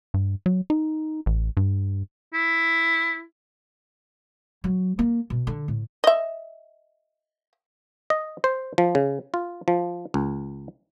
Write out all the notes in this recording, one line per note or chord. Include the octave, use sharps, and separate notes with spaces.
G2
F#3
D#4
A1
G2
E4
F#3
A#3
B2
D3
A2
D#5 E5
D#5
C5
F3
C#3
F4
F3
C#2